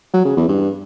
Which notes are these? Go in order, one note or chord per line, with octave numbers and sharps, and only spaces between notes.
F#3
C#3
E2
G2